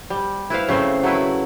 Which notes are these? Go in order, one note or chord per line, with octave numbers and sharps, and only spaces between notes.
G3
E4 B4 C5 F5
C#3 A3 C4 C5
F#3 A3 E4 B4